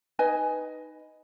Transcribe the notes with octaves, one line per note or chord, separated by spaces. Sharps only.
D#4 B4 D#5 G#5